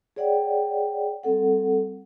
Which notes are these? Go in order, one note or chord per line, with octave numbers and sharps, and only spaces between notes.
G#4 C#5 D5 F#5 G5
G3 C4 A4 F#5